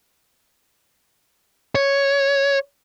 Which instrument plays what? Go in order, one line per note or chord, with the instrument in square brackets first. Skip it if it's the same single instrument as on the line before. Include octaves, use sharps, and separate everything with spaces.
[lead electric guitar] C#5